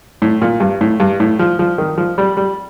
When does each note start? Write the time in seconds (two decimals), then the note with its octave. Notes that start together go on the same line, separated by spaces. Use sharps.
0.22 A2
0.42 A#2
0.60 G2
0.81 A2
1.00 G2
1.20 A2
1.39 F3
1.59 F3
1.78 D#3
1.98 F3
2.18 G3
2.37 G3